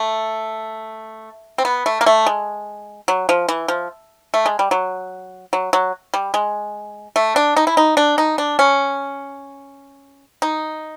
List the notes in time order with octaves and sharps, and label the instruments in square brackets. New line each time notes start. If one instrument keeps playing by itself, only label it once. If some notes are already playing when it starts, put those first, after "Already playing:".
Already playing: [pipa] A3
C4
B3
A3
A#3
A3
G#3
F#3
F3
E3
F3
A3
G#3
G3
F#3
F#3
F#3
G3
G#3
A3
D4
D#4
E4
D#4
D4
D#4
D4
C#4
D#4